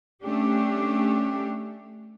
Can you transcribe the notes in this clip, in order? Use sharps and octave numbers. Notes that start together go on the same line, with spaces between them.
A3 C#4 D4 G4